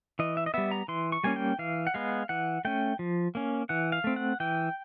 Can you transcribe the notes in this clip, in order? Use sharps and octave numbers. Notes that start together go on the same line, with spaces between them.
E3 D#5
E5
D#5
G3 B3 E5
A#5
E3 C6
C#6
G3 A#3 C#4 G#5
G5
E3 F5
F#5
G#3 B3 F5
E3 F#5
A3 C#4 G5
F3
A#3 C#4
E3 F#5
F5
A3 C4
F#5
E3 G5